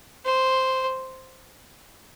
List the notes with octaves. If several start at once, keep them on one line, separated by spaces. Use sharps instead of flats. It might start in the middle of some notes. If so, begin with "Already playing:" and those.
C5